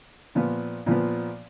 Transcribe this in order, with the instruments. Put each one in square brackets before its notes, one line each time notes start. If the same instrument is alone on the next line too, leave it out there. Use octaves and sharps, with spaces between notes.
[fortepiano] A#2 F3 B3
A#2 F3 B3